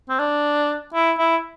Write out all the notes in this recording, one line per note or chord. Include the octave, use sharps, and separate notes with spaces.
C4
D4
E4
E4